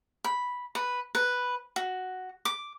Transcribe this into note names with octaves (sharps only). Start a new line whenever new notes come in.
B5
B4
B4
F#4
D6